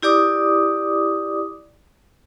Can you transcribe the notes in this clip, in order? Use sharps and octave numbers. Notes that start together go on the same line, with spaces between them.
E4 G4 D5 D6 D#6